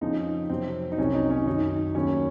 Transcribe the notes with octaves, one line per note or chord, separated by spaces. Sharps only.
F2 C#3 F3 D#4
F2 C3 F#3 C4
D#4
C2 C3 F#3 C#4
D#4
C#4
F#2 D#3 F#3 D#4
D#2 C#3 F#3 C#4